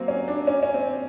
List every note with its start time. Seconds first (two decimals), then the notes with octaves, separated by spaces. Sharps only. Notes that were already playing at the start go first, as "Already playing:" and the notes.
Already playing: F#3 A#3 C4
0.08 C#4
0.28 D4
0.47 C#4
0.63 C#4
0.74 C4